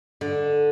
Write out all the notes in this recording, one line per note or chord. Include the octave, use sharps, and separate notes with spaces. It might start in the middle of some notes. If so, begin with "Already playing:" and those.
D3